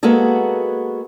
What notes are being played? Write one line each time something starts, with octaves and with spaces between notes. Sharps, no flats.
G#3 A#3 B3 F#4 G#4 A4